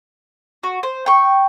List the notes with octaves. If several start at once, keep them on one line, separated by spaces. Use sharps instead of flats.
F#4
C5
G5 C#6